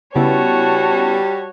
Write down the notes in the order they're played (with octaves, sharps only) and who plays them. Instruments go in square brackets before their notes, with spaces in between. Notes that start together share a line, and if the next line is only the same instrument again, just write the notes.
[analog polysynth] C#3 B3 E4 [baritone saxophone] G3 [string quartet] F#4 C#5 [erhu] A5